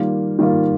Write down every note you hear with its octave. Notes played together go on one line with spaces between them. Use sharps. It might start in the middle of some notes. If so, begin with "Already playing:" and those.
Already playing: D#3 G3 A#3 F4
D#3 G3 A#3 F4